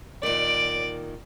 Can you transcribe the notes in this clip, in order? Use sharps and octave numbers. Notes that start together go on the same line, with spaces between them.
A#2 D#3 D5 D7